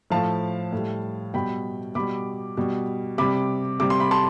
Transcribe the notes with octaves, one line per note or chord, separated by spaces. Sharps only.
A2 F3 F5 A5
A2 G3
B2 G3 G5 B5
B2 G3 B5 D6
B2 G3
C3 G3 B5 D6
C3 G3 D6
C6
B5
A5 C6